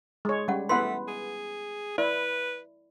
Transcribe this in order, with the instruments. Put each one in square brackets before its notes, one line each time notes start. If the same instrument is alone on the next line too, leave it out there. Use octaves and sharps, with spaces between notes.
[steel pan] G#3 C#5
[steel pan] G3 [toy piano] C#4 F#5
[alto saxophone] A3 [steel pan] B3 E4 B4 [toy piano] F#5 C6
[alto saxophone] G#4
[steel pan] E4 [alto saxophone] B4 [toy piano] D5